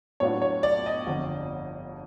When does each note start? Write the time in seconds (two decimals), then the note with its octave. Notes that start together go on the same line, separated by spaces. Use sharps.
0.20 A2 F#3 B3 D4 F4 C#5
0.42 C#5
0.63 D5
0.86 D#5
1.07 G1 F2 D3